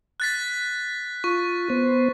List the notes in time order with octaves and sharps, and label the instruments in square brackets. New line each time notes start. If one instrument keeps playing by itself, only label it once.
[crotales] F#6 A6 B6
[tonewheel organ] F4 [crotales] C#6
[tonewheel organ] B3 C5